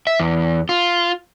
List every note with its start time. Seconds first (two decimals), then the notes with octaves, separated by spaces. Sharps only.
0.07 E5
0.20 E2
0.69 F4